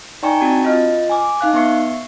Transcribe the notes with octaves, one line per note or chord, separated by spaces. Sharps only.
D#4 D5 G5 G#5 A#5 C#6
C4 D4 F#4 A5 G#6
F4 D#5 F6
G#5 D6
D#4 F5 F#6
B3 E5 C#6 C7